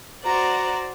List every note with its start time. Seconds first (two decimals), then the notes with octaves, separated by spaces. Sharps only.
0.25 F#4 C5 D5 A#5